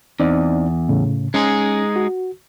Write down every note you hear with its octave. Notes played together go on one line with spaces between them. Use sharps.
E2 C4 D#4 D5
A2 C#3
G#3 C#4 D#4 G#4
F#4